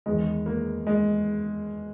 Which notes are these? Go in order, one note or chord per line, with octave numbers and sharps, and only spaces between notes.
E2 D#3 G#3
A#3
G#3